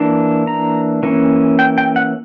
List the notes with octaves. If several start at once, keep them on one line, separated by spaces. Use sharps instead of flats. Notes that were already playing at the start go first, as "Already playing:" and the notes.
Already playing: E3 A#3 D4
A#5
E3 A#3 C#4
G5
G5
F#5